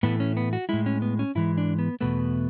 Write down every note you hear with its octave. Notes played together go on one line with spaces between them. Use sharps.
A2 E3 A3 B3
C#4
B3
F#4
A2 G#3 E4
C#4
B3
C#4
G#2 E3 G#3 E4
D4
B3
E2 B2 A3 B3